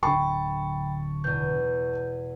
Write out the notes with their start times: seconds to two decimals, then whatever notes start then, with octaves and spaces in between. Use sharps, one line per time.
0.03 D1 D3 G5 A5 B5 C#6
1.24 E2 B2 G6